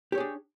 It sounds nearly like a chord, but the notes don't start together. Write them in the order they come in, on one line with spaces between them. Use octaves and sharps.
G4 C#5 G#4 D4